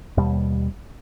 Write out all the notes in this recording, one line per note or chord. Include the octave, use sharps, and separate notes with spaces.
D#2 B2 G3